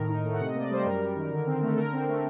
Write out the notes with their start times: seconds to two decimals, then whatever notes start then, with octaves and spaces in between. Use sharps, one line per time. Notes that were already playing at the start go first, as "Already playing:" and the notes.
Already playing: A2 D#3 A#4
0.09 D#4
0.25 A3
0.34 F#5
0.40 C3
0.47 D#5
0.55 A#3 D5
0.71 G3 C5
0.85 F#2 A#4
1.01 G3
1.16 D#3
1.32 D3
1.47 C4
1.62 A3
1.73 A4
1.77 D3 A#4
1.93 C4
2.08 A3